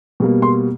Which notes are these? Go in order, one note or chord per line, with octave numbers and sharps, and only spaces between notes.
B2 G3 A#3
C6